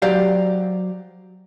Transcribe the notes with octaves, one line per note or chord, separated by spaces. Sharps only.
F#3 G4 C5 D5 F5